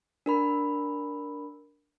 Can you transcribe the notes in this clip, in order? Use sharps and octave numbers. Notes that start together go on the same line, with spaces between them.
D4 A#4 B5